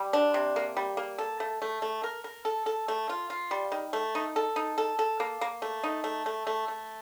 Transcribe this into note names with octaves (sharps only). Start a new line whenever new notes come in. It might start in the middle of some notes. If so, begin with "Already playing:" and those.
Already playing: G3
D4
C3
A#3
G3
A#3
A4
A3
A3
A3
A#4
A#4
A4
A4
A3
F4
F4
G3
D#3
A3
D#4
A4
D#4
A4
A4
A#3
A#3
A3
D#4
A3
A3
A3
A3